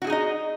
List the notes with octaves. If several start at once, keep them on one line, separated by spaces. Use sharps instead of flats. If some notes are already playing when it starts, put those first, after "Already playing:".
D#4 E4 F#4 G#4 D#5